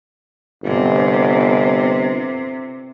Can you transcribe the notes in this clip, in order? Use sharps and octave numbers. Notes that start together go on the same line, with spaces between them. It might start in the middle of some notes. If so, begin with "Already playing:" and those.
G1 C3